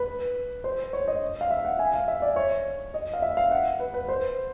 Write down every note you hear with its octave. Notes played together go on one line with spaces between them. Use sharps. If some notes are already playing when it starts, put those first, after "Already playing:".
Already playing: B4
C5
C#5
D#5
F5
E5
F#5
G#5
F5
E5
D5
C#5
D#5
F5
E5
F5
F#5
B4
B4
C5